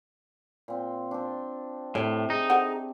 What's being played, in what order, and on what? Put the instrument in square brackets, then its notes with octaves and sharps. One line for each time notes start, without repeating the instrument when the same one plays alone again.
[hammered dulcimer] A#2 C4
C4 D4
[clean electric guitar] A2 [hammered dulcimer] C3 [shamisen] A#4 C#5
[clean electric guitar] D#4 [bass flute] G#4
[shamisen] A4 C5 F#5